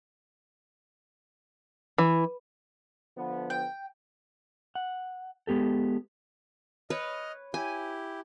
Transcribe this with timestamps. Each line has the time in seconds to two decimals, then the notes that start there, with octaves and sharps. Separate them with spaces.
1.98 E3
3.17 D3 F3 B3
3.50 G5
4.75 F#5
5.47 G#3 B3 G4 A4
6.90 B4 C#5 D#5 F6
7.54 E4 G4 G#5